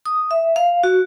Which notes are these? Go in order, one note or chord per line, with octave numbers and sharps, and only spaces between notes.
D#6
E5
F5
F#4